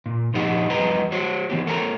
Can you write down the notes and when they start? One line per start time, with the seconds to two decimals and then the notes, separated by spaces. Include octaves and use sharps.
0.06 A#2
0.34 A#2 F3 D#4 G4 D#5 F#5
0.69 E2 F3 G3 B4 D#5 A#5
1.12 F#4 C5 C#5
1.50 E3 G3 B3 G4
1.67 A#3 A4 A#4 C#5 G#5 A#5